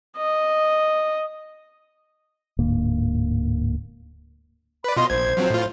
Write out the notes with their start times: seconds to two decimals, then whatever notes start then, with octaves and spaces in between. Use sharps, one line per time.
0.17 D#5
2.59 D1 G#2 D3 A#3
4.84 B4 D5 B5
4.97 B2 F4 D#5 C6
5.10 A#1 C5 G#6
5.37 F3 F#3 C4
5.50 A2 F4